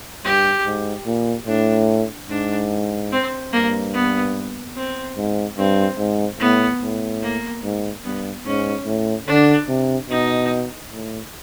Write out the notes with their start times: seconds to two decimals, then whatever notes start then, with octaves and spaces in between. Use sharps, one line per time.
0.24 G2 G4
0.65 G#2
1.06 A#2
1.47 A2 D4
2.29 G#2 D4
3.12 C4
3.53 G2 A#3
3.93 B3
4.76 C4
5.17 G#2
5.57 G2 C4
5.98 G#2
6.40 A2 B3
6.82 A2
7.23 A#3
7.63 G#2
8.04 G2 B3
8.45 G#2 C#4
8.86 A2
9.28 D3 D4
9.69 C3
10.09 B2 D#4
10.92 A2